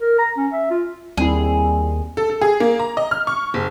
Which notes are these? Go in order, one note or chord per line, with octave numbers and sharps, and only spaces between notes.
A#4
A#5
C#4
E5
F4
D#2 G3 C4 E4 G#4
A4
A4
G#4
A#3
A#5
D#5
F6
C#6
F#1